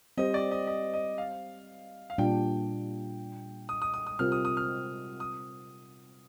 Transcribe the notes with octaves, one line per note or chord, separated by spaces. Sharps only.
G3 C4 G4 C5 D#5
D5
D#5
D#5
D#5
F5
F5
A#2 G3 D4 G5
D#6
D#6
D#6
D#6
C3 G3 C4 F4 A#4 F6
D#6
D#6
F6
D#6